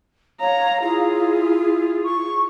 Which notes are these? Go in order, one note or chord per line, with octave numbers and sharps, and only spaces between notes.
C#5 F5 A#5
E4 F4 G#4
C#6